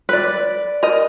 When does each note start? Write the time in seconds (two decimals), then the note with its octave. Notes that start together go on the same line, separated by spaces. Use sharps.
0.09 B4 D5
0.83 A#4 D#5